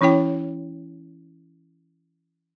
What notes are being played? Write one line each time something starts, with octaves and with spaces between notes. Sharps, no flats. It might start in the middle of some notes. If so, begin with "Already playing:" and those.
E3 C#4 E4 C#5 G5